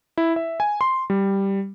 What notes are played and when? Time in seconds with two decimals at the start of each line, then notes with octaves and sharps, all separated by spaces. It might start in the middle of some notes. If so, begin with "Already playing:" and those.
0.18 E4
0.36 E5
0.60 G#5
0.81 C6
1.10 G3